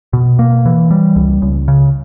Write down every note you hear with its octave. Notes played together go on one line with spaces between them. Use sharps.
B2
A#3
E3
G3
C#2
C#2
C#3